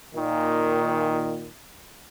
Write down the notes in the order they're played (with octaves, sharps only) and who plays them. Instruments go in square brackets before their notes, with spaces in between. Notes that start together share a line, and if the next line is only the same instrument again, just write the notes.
[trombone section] A#2 D#3